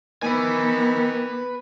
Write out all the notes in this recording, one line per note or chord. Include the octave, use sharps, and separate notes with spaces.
D#3 B3 B4 G#5